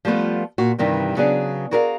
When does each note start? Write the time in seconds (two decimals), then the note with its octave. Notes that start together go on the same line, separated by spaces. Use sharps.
0.05 F3 G3 A3 B3 F4
0.58 A#2 F#4
0.78 G2 C3 D#3 E3 G3
1.16 C#3 F#3 B3 D4 G#4
1.71 F#4 G#4 A#4 D5 E5 F5